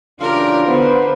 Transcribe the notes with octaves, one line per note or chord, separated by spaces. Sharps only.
C#3 E3 D4 F4 G4 A#4
D3 B3 B4 C5